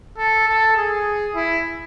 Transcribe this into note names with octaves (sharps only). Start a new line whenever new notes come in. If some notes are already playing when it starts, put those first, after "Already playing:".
A4
A4
G#4
E4